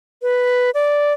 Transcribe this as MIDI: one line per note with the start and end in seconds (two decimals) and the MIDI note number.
0.22 0.70 71
0.74 1.13 74